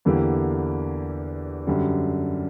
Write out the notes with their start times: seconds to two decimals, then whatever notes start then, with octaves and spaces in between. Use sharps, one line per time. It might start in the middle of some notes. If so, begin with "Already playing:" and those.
0.05 E2 D3 A#3 E4 G4
1.67 F#2 D3 G3